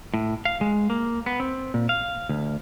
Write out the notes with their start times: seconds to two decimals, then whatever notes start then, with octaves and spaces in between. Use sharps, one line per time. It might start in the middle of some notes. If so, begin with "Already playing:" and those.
0.14 A2
0.45 F5
0.61 G#3
0.90 A#3
1.26 B3
1.40 C4
1.74 A#2
1.89 F5
2.29 D2